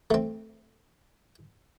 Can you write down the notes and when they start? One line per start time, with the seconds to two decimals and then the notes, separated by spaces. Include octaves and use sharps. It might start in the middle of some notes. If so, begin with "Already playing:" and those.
0.11 A3 C4